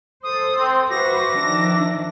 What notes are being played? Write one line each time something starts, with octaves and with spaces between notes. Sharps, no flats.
A4 C5 D#6
C4
F#4 B4 C5 E5 D6 A#6
D#3 F3 D4